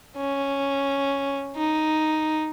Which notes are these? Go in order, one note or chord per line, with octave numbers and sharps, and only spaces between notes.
C#4
D#4